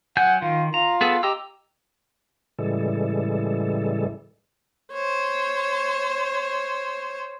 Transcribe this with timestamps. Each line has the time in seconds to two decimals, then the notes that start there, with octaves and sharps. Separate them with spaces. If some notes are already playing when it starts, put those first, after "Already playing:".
0.17 F#3 F#5 G#5 G6
0.42 D#3 F4
0.74 F4 A#5
1.01 B3 G#4 A4
1.23 G4 D#5 A#5 E6
2.59 A2 C#3 E3 G3 G#3 A4
4.93 C5 C#5